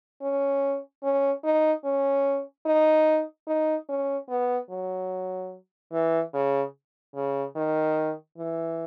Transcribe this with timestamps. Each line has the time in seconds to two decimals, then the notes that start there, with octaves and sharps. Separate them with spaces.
0.22 C#4
1.03 C#4
1.44 D#4
1.84 C#4
2.66 D#4
3.47 D#4
3.89 C#4
4.29 B3
4.70 F#3
5.93 E3
6.34 C#3
7.15 C#3
7.56 D#3
8.38 E3